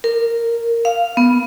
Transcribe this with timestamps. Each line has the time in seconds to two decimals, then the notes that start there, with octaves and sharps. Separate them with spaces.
0.04 A#4
0.85 F5
1.17 B3